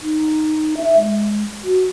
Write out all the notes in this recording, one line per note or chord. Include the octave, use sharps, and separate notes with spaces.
D#4
E5
G#3
F#4